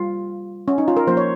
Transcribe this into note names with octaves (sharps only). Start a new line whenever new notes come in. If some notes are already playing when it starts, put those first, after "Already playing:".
Already playing: G3 F4
C#4
D#4
F4
A#4
F3 A#3 C#4 C5
C#5